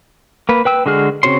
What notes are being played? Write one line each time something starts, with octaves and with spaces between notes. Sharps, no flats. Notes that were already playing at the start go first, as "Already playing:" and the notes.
A#3 B4
B4 G5 E6
D3 G#3 F#4 G#4 F6
C#3 C4 F#4 C#5 C6